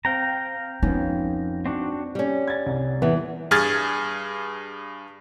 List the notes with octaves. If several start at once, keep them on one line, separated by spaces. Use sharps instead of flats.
C4 F5 G5 A#5
F2 B3 C#4 D#4
C4 D4 F#4
G3 C#4
G#6 A6
C2
E2 E3 B3
G2 G#4 F6 G#6 A6